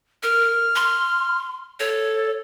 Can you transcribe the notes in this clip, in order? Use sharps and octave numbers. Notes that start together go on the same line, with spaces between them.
A#4 F6
C6
A4 C#5